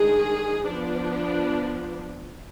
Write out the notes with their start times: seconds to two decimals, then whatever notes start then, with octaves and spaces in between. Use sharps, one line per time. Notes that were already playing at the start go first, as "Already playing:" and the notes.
Already playing: D#3 G#3 D4 G#4
0.63 F3 B3 D4